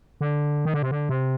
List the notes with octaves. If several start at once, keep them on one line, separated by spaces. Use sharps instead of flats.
D3
D#3
D3
C3
D3
C3